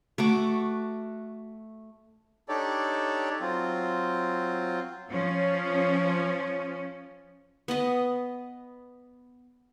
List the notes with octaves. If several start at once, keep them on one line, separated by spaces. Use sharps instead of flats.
A3 F#4 D6
D4 D#4 G4 A4 C#5 D5
F#3 C4 F4
F3 C#4
B3 B4 D#5